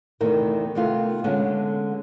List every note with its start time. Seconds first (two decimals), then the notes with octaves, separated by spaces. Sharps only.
0.21 E2 C3 D#3 A3 A#4
0.75 C3 D#3 A3 B3 F4
1.24 D3 G#3 B3 C#4